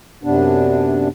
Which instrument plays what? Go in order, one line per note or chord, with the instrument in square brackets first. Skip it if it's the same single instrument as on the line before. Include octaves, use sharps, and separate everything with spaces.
[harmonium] F#2 C3 B3 D4